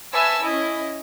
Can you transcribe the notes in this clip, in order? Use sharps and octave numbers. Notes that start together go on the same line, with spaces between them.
B4 C#5 E5 G#5 A5 E6
C#4 E4 D#5